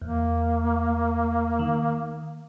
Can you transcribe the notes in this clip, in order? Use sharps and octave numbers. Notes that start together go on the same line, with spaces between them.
E2 A#3
D#3